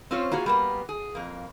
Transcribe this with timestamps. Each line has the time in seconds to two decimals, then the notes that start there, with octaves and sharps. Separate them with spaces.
0.11 C4 C#4 F4 C5 C#5
0.31 A#3 F4 F#4 G#4
0.46 G3 A#3 B3
0.89 G#4
1.15 F2 A#3